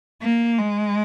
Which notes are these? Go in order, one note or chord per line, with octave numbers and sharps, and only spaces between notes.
A#3
G#3